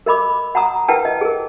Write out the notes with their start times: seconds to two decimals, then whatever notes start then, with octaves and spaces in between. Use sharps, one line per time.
0.06 A#4 D#5 B5 D6
0.55 F#5 A5 A#5 D#6
0.88 E4 A#4 B4 F#5 G5 A5
1.05 D#5
1.21 G#4 A#4